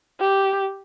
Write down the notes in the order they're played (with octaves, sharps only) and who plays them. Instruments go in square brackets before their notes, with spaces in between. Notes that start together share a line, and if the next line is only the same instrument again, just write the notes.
[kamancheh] G4